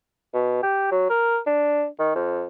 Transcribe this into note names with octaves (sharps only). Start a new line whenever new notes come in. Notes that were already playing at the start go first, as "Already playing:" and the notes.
B2
G4
F#3
A#4
D4
D#3
F2